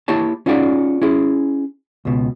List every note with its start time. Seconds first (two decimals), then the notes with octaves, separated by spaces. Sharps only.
0.08 A#3 E4 G4 C#5 A5
0.46 C#4 D#4 F4 F#4 G#4 D5
1.02 C#4 E4 G#4
2.05 C#2 B2